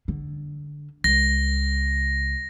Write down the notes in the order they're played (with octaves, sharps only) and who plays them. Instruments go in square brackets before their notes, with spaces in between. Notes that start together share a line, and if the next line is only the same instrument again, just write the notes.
[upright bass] D3
[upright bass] C#2 [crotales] A#6